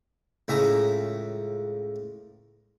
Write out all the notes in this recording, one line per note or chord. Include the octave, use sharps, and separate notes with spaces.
C#2 A2 E5 G#5 A#5